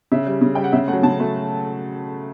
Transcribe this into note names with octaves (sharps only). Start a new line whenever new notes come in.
C#3 E5
G3
C#3
G3 G5
F#5
C#3 E5
A3 F#5
F#3
C#3 A5
F#3 A3